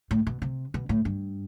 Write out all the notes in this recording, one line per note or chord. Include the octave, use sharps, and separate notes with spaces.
A2
B2
C3
B2
A2
G2